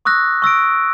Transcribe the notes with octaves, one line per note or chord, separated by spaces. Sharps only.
C#6 D#6 E6 F#6 A#6
C#6 E6 A#6 D7